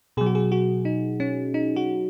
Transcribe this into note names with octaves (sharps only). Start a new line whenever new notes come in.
B2 F#3 G#4
F#4
G#4
F#4
D#4
C#4
D#4
F#4